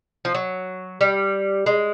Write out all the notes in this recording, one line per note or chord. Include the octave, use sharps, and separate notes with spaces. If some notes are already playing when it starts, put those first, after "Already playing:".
F3
F#3
G3
G#3